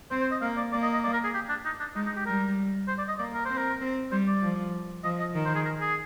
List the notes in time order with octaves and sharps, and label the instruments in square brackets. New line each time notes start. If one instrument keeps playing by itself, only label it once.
[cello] C4 [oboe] C5
[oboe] C5
D#5
[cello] A#3 [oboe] F5
[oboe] D5
[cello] A#3 [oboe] D5
[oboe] D#5
D#5
D5
A#4
G#4
G4
D4
D#4
D4
[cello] G#3 [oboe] D#4
[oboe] D#4
G4
[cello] G3 [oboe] A#4
[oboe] C5
D5
D#5
[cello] A#3 [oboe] D5
[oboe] A#4
[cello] C4 [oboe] C5
[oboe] A#4
[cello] C4
[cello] G3 [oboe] C5
[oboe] D5
[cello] F3
[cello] F3 [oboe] D#5
[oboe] D#5
[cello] D#3
[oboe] C5
G#4
A#4
G#4